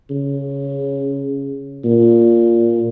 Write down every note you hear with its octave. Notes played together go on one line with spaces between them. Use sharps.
C#3
A#2